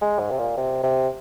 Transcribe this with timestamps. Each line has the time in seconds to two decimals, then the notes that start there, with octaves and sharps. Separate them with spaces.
0.01 G#3
0.19 G#2
0.31 C3
0.39 A#2
0.57 C3
0.83 C3